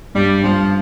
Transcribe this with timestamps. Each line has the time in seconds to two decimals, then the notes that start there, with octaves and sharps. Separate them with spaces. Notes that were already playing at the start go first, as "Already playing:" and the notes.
0.15 G2 G3
0.44 G2 F3